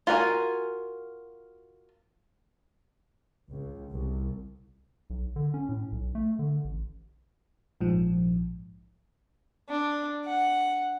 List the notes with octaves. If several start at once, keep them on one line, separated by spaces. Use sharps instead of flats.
F4 F#4 A#4 C#5 G#5
C#2
C2
B1
D3
C#4
A2
B1
A3
D3
A1
A#1 G#2 F3
D4
F#5